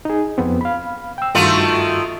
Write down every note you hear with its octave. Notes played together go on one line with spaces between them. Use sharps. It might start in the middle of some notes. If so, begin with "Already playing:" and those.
D#4 G#4
F2 B3 C4
F5 B5
G5 E6
G2 D#3 A3 F4 F#4